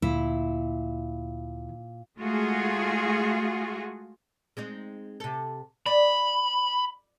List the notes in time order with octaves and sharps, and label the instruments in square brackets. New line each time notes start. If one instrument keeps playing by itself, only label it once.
[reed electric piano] D2 [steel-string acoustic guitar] A#2 [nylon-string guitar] E4
[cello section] G#3 A3 F4 F#4 G#4
[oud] G#3 C4 D#4
C3 A4
[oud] D5 [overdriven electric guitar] B5